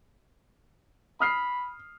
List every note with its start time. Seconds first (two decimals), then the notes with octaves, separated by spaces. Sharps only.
1.20 B5 D#6 F6 C7